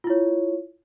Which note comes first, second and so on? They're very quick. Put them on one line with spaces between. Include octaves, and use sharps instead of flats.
F4 E4 C#5